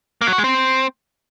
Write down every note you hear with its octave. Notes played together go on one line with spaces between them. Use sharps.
A#3
F#3
F#4
G#3
C4